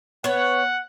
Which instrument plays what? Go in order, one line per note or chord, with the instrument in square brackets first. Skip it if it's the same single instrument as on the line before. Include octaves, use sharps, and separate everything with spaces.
[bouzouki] B3 C#5 [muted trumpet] F#5